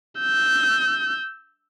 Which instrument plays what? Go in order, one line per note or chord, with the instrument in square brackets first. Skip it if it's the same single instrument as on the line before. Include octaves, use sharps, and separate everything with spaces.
[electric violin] E6 G6